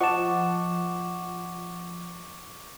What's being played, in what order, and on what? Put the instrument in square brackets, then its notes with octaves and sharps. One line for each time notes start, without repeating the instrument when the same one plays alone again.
[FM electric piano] F3 [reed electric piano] D#5 A5 [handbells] F#5 [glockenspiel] C#6 D6 E7